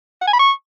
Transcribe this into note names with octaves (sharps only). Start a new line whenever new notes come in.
F#5
G#5
B5
C#6